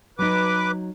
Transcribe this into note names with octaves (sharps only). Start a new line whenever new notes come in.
F#3 D#4 B4 D6